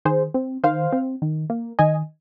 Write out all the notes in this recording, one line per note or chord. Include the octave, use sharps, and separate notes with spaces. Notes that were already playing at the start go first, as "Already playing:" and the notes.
D#3 G#4 C5
C4
D#3 C5 F5
C4
D#3
A#3
D#3 D#5 G#5